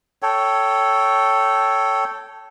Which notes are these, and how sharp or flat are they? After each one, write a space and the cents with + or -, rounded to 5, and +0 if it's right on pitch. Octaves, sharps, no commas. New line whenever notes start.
A4 +0 C#5 +10 G5 -15